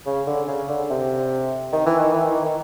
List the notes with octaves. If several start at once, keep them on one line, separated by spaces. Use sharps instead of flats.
C#3
D3
C#3
D3
C3
D#3
E3
D#3
E3
D#3
D#3